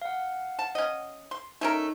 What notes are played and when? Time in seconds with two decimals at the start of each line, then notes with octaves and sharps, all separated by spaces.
0.02 F5 F#5
0.59 A5
0.75 C#4 D#5
1.31 C6
1.61 A3 C#4 D#4 A#4